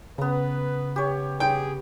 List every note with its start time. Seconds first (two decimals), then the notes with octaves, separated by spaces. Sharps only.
0.18 C#3 B3 B4 A#5
0.96 G4 C#5
1.40 G#4 G5